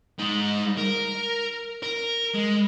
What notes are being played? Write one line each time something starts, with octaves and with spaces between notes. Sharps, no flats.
G#3 D#4
A#4
A#4
G#3